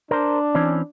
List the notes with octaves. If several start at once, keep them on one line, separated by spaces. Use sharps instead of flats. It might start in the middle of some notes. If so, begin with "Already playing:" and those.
D4 A#4 C5
E3 C4 C#4